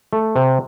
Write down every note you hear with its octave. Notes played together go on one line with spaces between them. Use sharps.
A3
C3